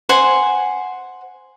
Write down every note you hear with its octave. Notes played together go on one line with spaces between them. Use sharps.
C5 F#5 G#5